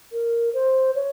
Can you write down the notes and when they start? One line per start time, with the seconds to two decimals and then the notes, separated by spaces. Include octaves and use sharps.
0.12 A#4
0.53 C5
0.95 C#5